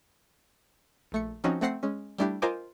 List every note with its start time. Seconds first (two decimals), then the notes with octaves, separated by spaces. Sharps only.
1.12 A#1 A3 C#7
1.44 F3 C4 C#4 D#4 F#4
1.61 A3 C4 F#5 A#6 C7
1.83 G#3 C#4
2.18 G3 A3 D4 E4 G4
2.42 F4 A#4 C5 D#5 G#5 D6